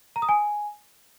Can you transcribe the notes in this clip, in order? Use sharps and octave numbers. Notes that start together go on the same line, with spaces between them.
A#5
D#6
G#5